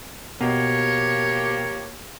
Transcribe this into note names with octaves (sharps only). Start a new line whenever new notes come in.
B2 F3 A#3 G4 C#5